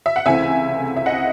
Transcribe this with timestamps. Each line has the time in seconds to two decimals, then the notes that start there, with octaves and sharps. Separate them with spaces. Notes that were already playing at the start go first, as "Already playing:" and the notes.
0.06 E5
0.16 F#5
0.26 C#2 C3 E3 A3 C4 E5 G#5
0.96 E5
1.06 D#5 F#5